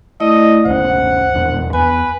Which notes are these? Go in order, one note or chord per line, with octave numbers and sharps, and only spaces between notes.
A3 E4 D5 D#5
G#1 D2 C#4 C5 F#5
D#1 E2 D4
E2 B4 G#5